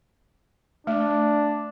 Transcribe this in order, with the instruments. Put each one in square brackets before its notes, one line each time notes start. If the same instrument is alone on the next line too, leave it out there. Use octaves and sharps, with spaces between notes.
[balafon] A3 [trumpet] D4